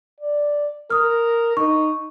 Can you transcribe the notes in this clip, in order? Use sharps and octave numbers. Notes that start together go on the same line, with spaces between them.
D5
A#4 D#6 F6
D#4 C#6